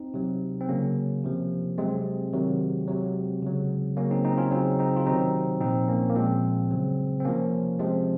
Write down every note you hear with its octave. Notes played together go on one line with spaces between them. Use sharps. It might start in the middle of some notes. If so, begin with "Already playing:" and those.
Already playing: C4 D#4
C3 F#3
C4
C#3 F#3 A#3 C#4
C3 F3
C3 F#3 G#3 C4
C3 D#3 F#3
C3 F#3
C#3 F#3
C#3 F#3 A#3 C#4
C4 D#4
C4 D#4
C#4 F4
C#3 F#3 C4 D#4
C4 D#4
F4
C3 D#3 F#3 C4 D#4
A#2 F3 C4 D#4
A#3 C#4
A#3
A#2 F3 G#3 C4
C#3 F#3
C4
C3 F3 A#3 C#4
C3 F3 G#3 C4